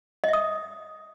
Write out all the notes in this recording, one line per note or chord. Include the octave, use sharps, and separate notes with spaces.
D#5 E5 D#6